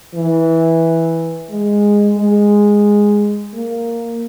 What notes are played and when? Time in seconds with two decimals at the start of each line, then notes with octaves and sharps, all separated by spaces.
0.14 E3
1.50 G#3
2.18 G#3
3.54 A#3